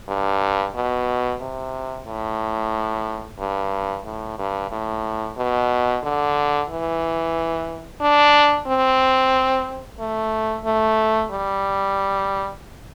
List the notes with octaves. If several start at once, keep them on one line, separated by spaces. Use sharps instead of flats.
G2
B2
C3
A2
G2
A2
G2
A2
B2
D3
E3
D4
C4
A3
A3
G3